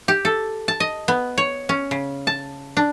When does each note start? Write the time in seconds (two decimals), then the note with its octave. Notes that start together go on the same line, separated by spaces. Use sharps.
0.08 G4
0.25 A4
0.68 A5
0.80 D#5
1.08 B3
1.38 C#5
1.69 C#4
1.91 C#3
2.27 A5
2.77 D4